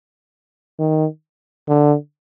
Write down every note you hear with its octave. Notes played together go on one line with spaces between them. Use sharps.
D#3
D3